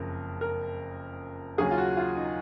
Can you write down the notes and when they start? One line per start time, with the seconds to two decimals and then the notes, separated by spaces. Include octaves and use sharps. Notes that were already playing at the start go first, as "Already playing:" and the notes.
Already playing: F#1 F2 C#3 A#4
0.41 A#4
1.58 D#2 C#3 F#3 C#4 G#4
1.71 F4
1.78 F#4
1.97 F4
2.17 D#4